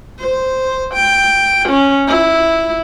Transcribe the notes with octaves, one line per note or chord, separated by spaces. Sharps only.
C5
G5
C#4
E4